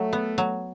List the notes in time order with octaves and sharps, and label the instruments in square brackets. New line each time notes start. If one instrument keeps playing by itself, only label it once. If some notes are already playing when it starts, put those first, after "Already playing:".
Already playing: [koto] F#3 [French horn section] A3
[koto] B3
F#3